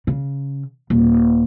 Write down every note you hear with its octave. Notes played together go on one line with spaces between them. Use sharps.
C#3
D#1